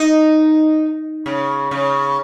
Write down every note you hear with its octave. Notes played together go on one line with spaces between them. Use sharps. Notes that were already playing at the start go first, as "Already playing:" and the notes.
Already playing: D#4
C#3
C#3